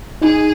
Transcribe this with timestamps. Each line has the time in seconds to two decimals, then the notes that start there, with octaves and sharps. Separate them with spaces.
0.22 D#4 G#4